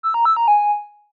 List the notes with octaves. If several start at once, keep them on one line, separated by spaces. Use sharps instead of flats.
E6
A#5
E6
A#5
G#5